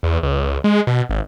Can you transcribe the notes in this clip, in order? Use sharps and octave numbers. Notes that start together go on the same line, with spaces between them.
E2
C#2
G#3
B2
G#1